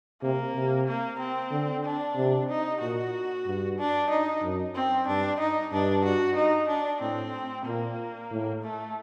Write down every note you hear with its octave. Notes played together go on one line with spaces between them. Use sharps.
C3 A#3
C3
A#3
C4
D3
D4
C3
D#4
A#2 F#4
G2
D4
D#4
F#2
C4
G2 D4
D#4
G2 D4
F#4
D#4
D4
A2 C4
A#2 A#3
A2
A3